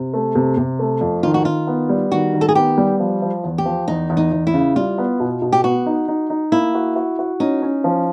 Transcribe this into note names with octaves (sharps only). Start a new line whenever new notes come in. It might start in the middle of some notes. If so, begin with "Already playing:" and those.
Already playing: C3
A3
C3
C3
A3
F2
D#3 F4
F#4
D#3 F4
B3
G3
D#3 F#4
D#3
A4
G#4
B3 G4
G3
F3
F3
E2
G4
F3
E2 D#4
E2
D#4
E2
E4
C#3
G3 F4
B3
B2
B2
G4
B3 F#4
D#4
D#4
D#4
A#3 E4
F#4
F#4
F#4
C#4 D#4
C#4
F3